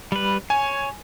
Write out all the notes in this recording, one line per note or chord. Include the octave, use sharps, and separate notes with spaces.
G3 B4
C#5 G#5